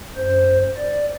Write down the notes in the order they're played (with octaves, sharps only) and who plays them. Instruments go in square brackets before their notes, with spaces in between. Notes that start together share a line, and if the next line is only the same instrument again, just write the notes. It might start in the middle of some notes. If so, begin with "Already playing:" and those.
[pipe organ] F#2 C5
D5